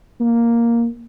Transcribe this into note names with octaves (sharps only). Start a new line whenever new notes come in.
A#3